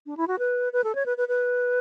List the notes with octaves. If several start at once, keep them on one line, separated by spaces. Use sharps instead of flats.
D4
E4
F#4
B4
B4
A4
C#5
B4
B4
B4